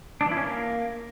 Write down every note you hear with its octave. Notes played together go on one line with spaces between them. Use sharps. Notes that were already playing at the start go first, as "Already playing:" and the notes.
D4
E3
E4
C#4
A#3